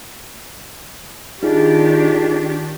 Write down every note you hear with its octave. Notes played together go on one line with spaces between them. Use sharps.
D#3 D4 D#4 F4 G4 G#4